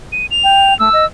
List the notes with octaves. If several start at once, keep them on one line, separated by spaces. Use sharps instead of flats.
D#7
F7
G5
A3 E6
D#5